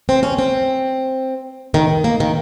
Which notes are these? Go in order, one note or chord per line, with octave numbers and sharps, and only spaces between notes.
C4
C#4
C4
D#3
A#3
D#3